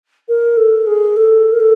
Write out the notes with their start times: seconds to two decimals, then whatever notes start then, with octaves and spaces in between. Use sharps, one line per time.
0.28 A#4
0.57 A4
0.86 G#4
1.16 A4
1.52 A#4
1.60 A4